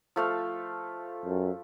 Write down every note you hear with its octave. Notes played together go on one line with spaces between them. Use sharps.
F3 A3 F5
F#2